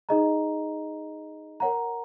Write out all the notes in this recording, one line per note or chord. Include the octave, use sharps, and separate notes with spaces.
D#4 G#4 D#5 A#5
A#4 C#5 F#5 A#5